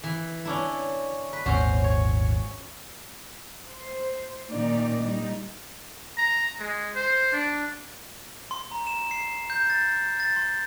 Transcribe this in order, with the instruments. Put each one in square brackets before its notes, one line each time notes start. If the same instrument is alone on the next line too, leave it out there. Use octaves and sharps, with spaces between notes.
[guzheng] E3
C#4 D4 E4
B4
[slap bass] G#1 D#2 A#2 [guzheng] C#4 F#4 C5
[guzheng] C#5
[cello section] C5
A#2 D#3 C#4 D#4 D5
G3 D#4
[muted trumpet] A#5
G#3
C5
D4
[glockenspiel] C6
A#5
E7
C7
G6
A6
A6
C6